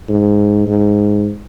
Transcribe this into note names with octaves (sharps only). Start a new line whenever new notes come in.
G#2
G#2